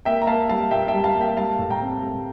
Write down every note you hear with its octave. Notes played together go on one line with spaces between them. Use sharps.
A#3 E5 G5
A#5
A#3 F5 A5
G3 F5 A5
A#2 E5 G5
E5 G5
G3
F5 A5
A#3
E5 G5
G3 F5 A5
A2
G5 A#5
C4
A2